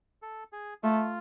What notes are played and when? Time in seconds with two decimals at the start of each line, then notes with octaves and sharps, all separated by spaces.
0.22 A4
0.52 G#4
0.83 A3 F4